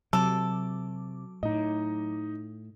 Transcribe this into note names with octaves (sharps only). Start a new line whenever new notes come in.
C3 F#3 A4 D6
A2 D#4 D#5